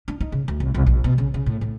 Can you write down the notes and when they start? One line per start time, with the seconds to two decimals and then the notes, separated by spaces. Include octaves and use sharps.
0.08 D4
0.20 D#4
0.32 C#3
0.48 D2
0.60 C2
0.74 C2
0.87 A#1
1.04 B2
1.18 C#3
1.34 C#3
1.46 A2
1.61 A2